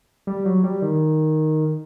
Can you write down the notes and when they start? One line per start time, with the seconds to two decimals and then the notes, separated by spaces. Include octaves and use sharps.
0.27 G3
0.45 F#3
0.64 G3
0.82 D#3